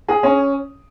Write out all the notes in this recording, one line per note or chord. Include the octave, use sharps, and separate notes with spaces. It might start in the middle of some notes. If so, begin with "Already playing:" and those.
G#4
C#4